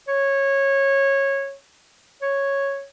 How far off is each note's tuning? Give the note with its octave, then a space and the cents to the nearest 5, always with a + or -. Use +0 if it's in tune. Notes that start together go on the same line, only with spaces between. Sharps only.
C#5 -15
C#5 -5